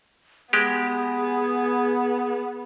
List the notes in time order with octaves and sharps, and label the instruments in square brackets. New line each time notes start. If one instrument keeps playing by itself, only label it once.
[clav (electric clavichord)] G#3 G4 [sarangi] B3 [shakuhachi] G#4